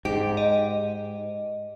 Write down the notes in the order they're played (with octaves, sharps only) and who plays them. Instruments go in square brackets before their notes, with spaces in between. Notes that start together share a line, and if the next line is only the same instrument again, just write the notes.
[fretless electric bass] G#2 [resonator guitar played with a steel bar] G4 [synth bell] D7
[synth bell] D#5